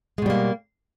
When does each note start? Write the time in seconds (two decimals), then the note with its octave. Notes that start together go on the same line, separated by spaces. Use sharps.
0.18 G#3
0.22 B2
0.26 G3
0.30 A#3